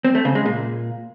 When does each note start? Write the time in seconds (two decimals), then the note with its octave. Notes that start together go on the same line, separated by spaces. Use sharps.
0.04 C4
0.15 A3
0.25 C#3
0.35 G#3
0.45 A#2